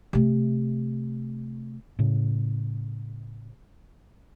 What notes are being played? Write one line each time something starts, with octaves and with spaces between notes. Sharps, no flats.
C3 A3
A2 C#3